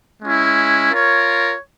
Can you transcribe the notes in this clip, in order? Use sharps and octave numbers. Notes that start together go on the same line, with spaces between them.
G#3 C#4 E4
F4 A#4 C#5